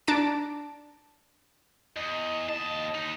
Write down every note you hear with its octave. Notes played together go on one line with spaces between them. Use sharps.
D4 A5 A#5 D7
E2 D#5
D#2 D#5 A5
D#2 D#4